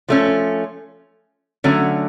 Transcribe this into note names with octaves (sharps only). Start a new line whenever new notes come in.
F3 A3 C#4
D3 F#3 A3 C#4